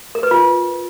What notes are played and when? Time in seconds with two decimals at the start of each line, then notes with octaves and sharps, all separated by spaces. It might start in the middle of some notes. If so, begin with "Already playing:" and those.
0.15 A#4
0.23 B4
0.31 F4